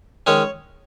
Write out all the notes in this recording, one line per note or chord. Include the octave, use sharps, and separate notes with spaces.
D#3 G#3 C#4 C#5